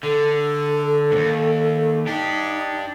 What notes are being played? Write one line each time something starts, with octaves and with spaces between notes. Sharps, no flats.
D3 A4
D#2 G#2
D4 D#4 G4